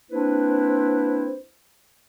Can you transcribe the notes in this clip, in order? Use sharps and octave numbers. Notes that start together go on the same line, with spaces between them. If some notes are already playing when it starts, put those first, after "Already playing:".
A#3 C4 D4 E4 B4 C5